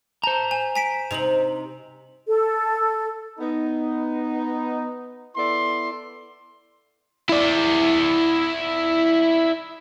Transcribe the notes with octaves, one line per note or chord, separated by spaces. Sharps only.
C5 A5 A#5
G#5
G#5 B6 D7
C3 D#4 F7 F#7
A4
B3 D#4
B3 E4 A4 D5 C6
E4 D5